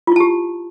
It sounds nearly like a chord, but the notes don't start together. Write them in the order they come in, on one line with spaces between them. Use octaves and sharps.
F4 E4 A5 G4